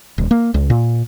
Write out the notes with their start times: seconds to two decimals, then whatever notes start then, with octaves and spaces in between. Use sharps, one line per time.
0.18 D#1
0.31 A#3
0.54 C#2
0.70 A#2